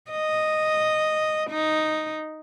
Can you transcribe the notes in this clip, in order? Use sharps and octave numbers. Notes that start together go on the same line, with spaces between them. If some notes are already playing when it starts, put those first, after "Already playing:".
D#5
D#4